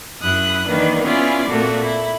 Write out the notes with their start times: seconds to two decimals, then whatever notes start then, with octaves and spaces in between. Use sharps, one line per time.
0.22 F#2 E4 D#6 F#6
0.68 D#3 E3 A#3 D4 B4
1.02 B3 C#4 E4 F4 G#4 D5
1.49 A#2 A3 A#3 C4 F#4
1.84 E4